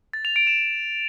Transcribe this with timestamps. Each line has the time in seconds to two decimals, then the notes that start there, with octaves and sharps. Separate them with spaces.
0.13 A6
0.25 F7
0.36 D7
0.47 E7